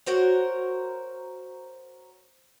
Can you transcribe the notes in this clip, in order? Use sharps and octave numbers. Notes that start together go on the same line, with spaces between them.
F#4 A#4 C5 C#5